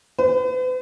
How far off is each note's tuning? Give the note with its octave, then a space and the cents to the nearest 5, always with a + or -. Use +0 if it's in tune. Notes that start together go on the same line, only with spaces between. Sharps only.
B4 +45